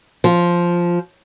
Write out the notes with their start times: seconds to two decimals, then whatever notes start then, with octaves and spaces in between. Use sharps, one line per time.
0.24 F3